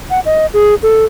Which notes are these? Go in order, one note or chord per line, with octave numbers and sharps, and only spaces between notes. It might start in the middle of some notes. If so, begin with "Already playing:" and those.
F#5
D#5
G#4
A4